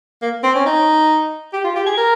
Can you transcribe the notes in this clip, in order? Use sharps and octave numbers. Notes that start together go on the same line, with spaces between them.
A#3
C4
C#4
D#4
G4
F4
G4
G#4
A#4